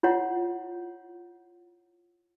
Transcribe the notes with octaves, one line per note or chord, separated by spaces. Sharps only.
E4 F4 C#5 F#5